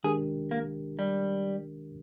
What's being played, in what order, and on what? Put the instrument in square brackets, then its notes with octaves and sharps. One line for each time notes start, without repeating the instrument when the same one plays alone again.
[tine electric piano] D#3 G#3 D4 G4 A#4 [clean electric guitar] G#4
[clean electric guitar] A#3
G3